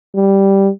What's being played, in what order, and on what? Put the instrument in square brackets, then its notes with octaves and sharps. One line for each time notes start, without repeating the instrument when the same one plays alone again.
[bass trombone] G3